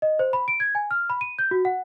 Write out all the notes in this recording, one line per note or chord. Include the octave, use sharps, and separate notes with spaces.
D#5
C5
B5
D7
G#6
G#5
F6
B5
D#7
G6
F#4
F#5